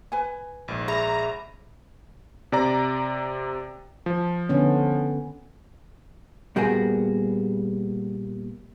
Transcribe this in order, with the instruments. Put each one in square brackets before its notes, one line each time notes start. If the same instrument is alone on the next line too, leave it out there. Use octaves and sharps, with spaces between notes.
[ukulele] B4 G#5
[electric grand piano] A#1 G#2
[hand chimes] G#4 E5 B5 [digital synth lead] A#5
[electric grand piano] C3 D5 A#5
F3
[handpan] D3 B3 C#4
[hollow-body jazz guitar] A#2 G3 A#3 B3 F#4 G#4